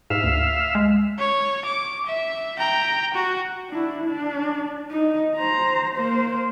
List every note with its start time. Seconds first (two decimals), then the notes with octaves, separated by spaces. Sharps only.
0.10 G#2 E5 F5
0.24 D2
0.75 G#3
1.19 C#5
1.65 D6
2.06 E5
2.59 G5 A#5
3.14 F#4
3.69 D4 E4
4.05 D4
4.90 D#4
5.36 C5 A#5
5.94 A#3 C5